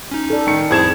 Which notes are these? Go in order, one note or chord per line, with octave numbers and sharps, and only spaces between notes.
C#4 D#4
A4 D5
D#3 C#7
F2 E4 G#4 C5 G#6 E7